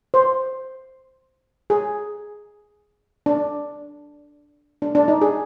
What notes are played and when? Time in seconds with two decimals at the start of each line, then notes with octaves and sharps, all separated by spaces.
0.14 C5
1.70 G#4
3.26 D4
4.82 D4
4.95 D4
5.08 D#4
5.22 G#4